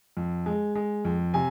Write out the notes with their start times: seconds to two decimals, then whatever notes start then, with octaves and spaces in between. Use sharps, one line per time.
0.17 F2
0.46 G#3
0.75 G#3
1.05 F2
1.34 C3 G#5